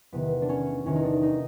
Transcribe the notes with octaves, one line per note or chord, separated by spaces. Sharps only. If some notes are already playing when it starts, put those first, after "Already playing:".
E2 C3 D#3 B3
D4
C#4
E2 C3 D#3 C#4
D#4
D4
D#4